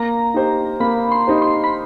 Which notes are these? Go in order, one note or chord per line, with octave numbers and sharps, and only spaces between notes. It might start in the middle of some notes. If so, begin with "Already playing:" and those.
Already playing: A#3 A#5
D#4 G4 C5
A#3 B5
C6
D#4 G4 C5
C6
B5